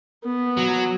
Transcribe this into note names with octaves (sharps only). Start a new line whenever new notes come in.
B3
F#3